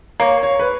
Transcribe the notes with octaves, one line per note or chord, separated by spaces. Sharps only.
A#3 C#5
C#5
B4